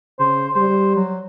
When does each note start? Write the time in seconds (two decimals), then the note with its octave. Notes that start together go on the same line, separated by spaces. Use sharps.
0.20 C#3 C5
0.55 G3 C5
0.96 F#3